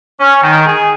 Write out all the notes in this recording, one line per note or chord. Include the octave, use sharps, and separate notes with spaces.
C#4
D#3
G#4